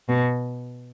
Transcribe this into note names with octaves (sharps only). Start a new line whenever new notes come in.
B2